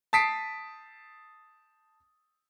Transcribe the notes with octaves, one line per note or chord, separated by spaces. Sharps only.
A5 D#6 B6 C7 D7